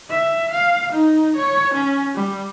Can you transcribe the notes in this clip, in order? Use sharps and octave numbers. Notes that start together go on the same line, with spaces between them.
E5
F5
D#4
C#5
C#4
G3